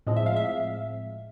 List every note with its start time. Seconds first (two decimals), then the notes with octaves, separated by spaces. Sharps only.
0.07 A2 F3 G#3 C4 D#5
0.17 E5
0.26 F5
0.36 E5